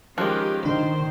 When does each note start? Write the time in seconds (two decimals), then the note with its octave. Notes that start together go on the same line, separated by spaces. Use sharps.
0.18 D#3 F3 G#3 C#4 G4 F#6
0.65 D#3 D4 C5